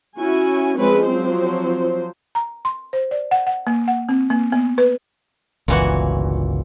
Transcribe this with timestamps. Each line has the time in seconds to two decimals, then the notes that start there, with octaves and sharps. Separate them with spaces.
0.19 C#4 E4 F#4 G#5
0.76 F3 G#3 C4 C#4 B4
1.05 F3 F#3 C4 C5
2.35 A#5
2.65 C6
2.93 C5
3.11 D5
3.31 F#5
3.47 F#5
3.67 A#3
3.88 F#5
4.09 C4
4.30 A#3
4.52 B3
4.78 B4
5.68 G1 C#2 A#2 E3 F#4